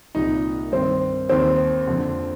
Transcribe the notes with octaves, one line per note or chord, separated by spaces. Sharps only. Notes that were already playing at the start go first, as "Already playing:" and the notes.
C2 A#2 D#4
G2 D#3 C4
D#2 D#3 C4
F2 D3